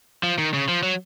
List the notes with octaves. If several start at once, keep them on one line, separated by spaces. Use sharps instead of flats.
F3
D#3
C#3
F3
F#3